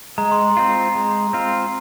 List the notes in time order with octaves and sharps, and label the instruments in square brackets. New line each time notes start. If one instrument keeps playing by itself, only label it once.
[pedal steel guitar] G#3 [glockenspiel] A#5
[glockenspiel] C6
A#5
[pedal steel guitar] C4 F4
[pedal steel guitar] G#3 [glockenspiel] A#5
[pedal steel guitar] C4 F4